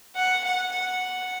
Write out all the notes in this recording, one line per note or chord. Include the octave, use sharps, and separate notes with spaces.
F#5
F#5
F#5